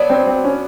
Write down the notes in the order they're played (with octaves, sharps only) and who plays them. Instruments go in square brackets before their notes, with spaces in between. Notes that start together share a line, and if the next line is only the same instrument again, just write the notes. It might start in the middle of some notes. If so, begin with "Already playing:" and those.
Already playing: [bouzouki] F#3 B3 D4
[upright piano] C4
C4
C#4